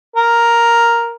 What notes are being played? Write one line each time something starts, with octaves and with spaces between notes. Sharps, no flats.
A#4